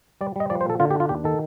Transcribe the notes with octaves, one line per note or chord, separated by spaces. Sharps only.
G3 D5
G3 D#5
F3 D5
C5
A#2 A4
D3 F4
G4
D4
F4
D#2 G4
D#3 A4